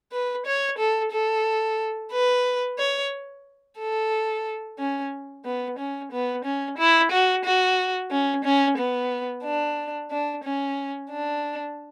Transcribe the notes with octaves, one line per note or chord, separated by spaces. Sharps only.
B4
C#5
A4
A4
B4
C#5
A4
C#4
B3
C#4
B3
C#4
E4
F#4
F#4
C#4
C#4
B3
D4
D4
C#4
D4